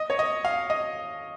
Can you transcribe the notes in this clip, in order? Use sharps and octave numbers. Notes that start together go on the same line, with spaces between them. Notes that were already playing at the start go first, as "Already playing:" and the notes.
Already playing: D#5
C#5
D#5
F5
D#5